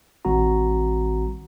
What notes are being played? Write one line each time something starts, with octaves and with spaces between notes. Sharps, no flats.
A1 D#3 G3 C4 F#4 A#5